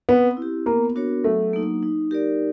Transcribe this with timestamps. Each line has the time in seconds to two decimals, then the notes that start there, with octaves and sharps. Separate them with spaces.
0.09 B3 C4
0.37 E4
0.42 G4
0.66 A#3 B3
0.95 D4 F#4 A#4 C#5
1.24 F#3 A3
1.53 A#3 D#4
1.82 D#4
2.11 G4 A#4 D5